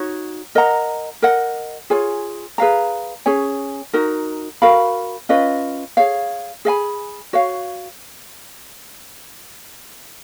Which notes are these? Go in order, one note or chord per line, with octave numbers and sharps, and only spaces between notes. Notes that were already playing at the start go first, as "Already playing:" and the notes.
Already playing: D#4 F#4 C#5
A#4 D#5 F#5 A#5
A#4 D#5 F#5
F4 G#4 C#5 G#5
G#4 B4 F5 A#5
C#4 G#4 C#5 G#5
D#4 F#4 A#4
F#4 A#4 F5 B5
C#4 F4 B4 D#5
G#4 C#5 F5
G#4 D#5 G#5 B5
F#4 C#5 F5